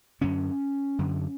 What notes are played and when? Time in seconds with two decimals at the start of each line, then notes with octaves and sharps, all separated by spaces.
0.21 F#2 D3 C#4
0.99 F#2 D3